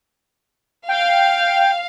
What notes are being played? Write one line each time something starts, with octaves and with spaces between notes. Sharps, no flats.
F5 G5